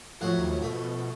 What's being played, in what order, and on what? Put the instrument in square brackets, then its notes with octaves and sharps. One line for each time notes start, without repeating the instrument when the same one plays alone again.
[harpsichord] A2 F#3 F#5 [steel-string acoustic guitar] F3
[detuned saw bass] D#2
[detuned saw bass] B2 [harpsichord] A3